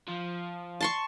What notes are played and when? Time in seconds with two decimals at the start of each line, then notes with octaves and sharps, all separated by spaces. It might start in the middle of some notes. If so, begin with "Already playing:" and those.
0.08 F3
0.81 A5 C6 C#6